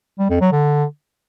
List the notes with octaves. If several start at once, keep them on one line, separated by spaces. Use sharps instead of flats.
G3
F2
F#3
D3